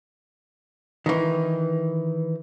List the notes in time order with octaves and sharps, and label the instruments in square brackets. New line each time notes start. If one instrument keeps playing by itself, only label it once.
[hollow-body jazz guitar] D#3 E3